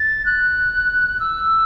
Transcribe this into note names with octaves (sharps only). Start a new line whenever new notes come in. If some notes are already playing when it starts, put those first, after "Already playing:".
Already playing: A6
F#6
E6